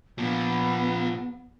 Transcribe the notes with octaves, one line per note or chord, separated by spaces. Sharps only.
A#2 F3 B3